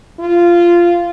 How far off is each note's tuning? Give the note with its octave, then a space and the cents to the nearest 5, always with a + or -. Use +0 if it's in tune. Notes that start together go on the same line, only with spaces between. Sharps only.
F4 -10